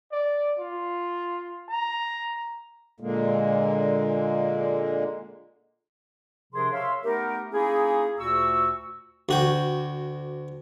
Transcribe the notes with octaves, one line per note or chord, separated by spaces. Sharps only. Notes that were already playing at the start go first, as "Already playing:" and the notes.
D5
F4
A#5
A#2 D3 G#3 A#3
C3 F3 D4 G#4 A#4 C6
C#5 E5 F5 C6
A3 B3 D#4 G4 A#4
A#3 C#4 D#4 E4 G#4
D2 A#2 F#4 C#6 E6
D2 F#4 G5